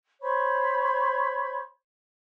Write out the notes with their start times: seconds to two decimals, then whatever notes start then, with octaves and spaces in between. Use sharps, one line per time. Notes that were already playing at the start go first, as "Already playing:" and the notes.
0.22 C5 C#5 B5 C#6